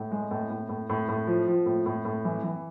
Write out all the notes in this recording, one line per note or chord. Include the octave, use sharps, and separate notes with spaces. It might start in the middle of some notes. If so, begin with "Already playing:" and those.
Already playing: A2
G#3
A2
A2
A2
A2
A2
F3
F3
A2
A2
A2
E3
E3